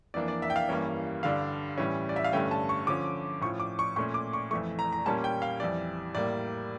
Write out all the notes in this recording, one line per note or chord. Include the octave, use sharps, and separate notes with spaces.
F2 E3 A#3 D4 D5
D5
E5
G5
F5
G2 E3 G3 A#3 C#4
G2 D3 G3 D4 F5
A2 E3 G3 C#4
D5
E5
F5
G2 D3 A3 C#4 G5
A5
C#6
D3 F3 C#4 D6
A2 F3 C#4 C#6
D6
C#6
A#2 A3 C#4 C#6
D6
C#6
F2 E3 A3 C#6
A#5
A#5
A#2 G3 A#3 C#4 A5
G5
F5
F2 E3 G3 D5
A2 G3 A#3 D5